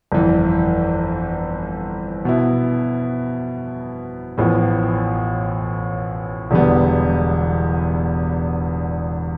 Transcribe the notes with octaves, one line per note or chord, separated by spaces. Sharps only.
G1 F2 E3
B2 B3 E4
A1 A2 F3 B3
E1 E2 D3 G3 B3